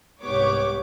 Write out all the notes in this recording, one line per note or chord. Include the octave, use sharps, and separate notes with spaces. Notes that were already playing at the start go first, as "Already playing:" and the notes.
C2 G#2 B3 G4 C#5 D6